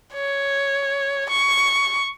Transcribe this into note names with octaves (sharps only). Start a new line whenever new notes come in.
C#5
C#6